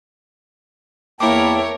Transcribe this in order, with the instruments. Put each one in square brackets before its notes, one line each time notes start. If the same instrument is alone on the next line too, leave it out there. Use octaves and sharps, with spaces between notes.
[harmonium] E2 G5 A5 [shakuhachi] A#3 [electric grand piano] E4 D6 [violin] A#4 C#5